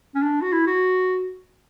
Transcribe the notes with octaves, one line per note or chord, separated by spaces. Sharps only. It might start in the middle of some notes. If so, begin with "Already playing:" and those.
C#4
D4
F#4
E4
F#4